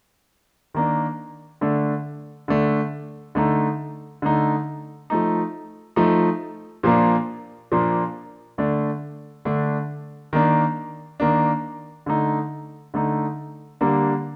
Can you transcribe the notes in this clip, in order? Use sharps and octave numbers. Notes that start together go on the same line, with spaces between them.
D#3 A#3 D4
D3 A3 D4
D3 A3 D4
D3 A3 D#4
D3 A3 D#4
F3 A3 D#4
F3 A3 D#4
A#2 F3 A#3 D4
A#2 F3 A#3 D4
D3 A3 D4
D3 A3 D4
D#3 A#3 D4
D#3 A#3 D4
D3 A3 D#4
D3 A3 D#4
D3 G3 A#3 D4